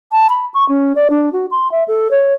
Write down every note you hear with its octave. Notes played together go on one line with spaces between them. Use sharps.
A5
B5
C#6
C#4
D5
D4
F#4
C6
E5
A4
C#5